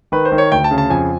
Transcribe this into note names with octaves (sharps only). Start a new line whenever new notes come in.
D#3 B4
C5
D#3
C#5
D2 G5
A5
C#3
A5
F2 G#5